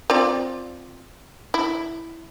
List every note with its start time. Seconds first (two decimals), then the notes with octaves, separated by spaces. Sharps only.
0.10 C4 F4 D5
1.54 E4